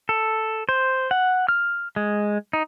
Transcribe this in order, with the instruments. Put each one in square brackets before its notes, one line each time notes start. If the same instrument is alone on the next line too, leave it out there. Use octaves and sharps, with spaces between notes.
[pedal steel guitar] A4
C5
F#5
F6
G#3
D#4